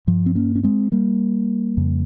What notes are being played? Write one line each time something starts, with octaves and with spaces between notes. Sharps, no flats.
G2 F3
C4
A#3 C#4
C#4
G#3 C4
G3 A#3
F2 C#3